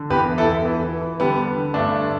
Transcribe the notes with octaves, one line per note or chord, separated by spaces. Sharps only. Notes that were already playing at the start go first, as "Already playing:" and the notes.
Already playing: D3
E2 G4 B4
E3
E4 A4
E2
E3
E3
E3
D3 G3 B3
D3
D3
G2 A3 D4
D3